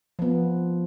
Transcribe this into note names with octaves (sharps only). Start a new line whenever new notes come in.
F3 B3